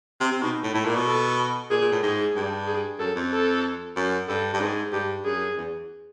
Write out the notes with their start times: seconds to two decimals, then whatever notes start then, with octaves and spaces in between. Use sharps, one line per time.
0.21 C3
0.32 C3
0.42 B2 D#4
0.63 A2
0.74 A2 E4
0.85 A#2
0.96 B2
1.07 A4
1.71 A#2 G#4
1.82 A#2
1.92 A2
2.03 G#2 G#4
2.36 G2
2.67 G#4
2.99 F#2 A4
3.16 F2
3.32 A4
3.96 F#2
4.28 G2 A4
4.54 G2
4.61 G#2 G#4
4.92 G2 G4
5.25 F#2 G#4
5.57 E2